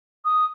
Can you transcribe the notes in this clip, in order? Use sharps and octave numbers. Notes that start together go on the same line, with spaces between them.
D#6